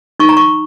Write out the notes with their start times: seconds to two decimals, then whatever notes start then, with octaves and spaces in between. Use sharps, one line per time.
0.20 D#4 C#6
0.29 A#5
0.37 C#6